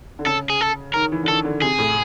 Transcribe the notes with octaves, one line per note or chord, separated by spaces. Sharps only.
D3
C#3 A4
G#4
A4
D#3 A#4
E3
D3
D#3 A4
D3
C3 G#4
A2